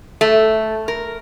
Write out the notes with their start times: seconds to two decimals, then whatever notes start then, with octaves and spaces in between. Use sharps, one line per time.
0.21 A3
0.88 A#4